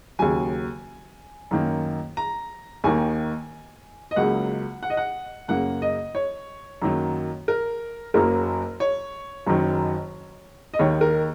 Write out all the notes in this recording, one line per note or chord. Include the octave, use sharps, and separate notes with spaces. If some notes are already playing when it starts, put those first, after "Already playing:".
D#2 C#3 F#3 G#5
F#2 D#3 A#3
A#5
D#2 D#3 A#3 G#5
D#5
C#2 C#3 F#3 A#3 F#5
F#5
D#5
F#5
F#2 C#3 A#3 F#5
D#5
C#5
F#2 D#3 F#3 A#3
A#4
F#1 F#2 F#3 A#3 A#4
C#5
F#1 F#2 D#3 F#3
D#5
D#2 D#3 A#3 C#5
A#4